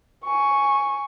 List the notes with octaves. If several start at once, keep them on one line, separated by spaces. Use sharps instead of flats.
G#5 C#6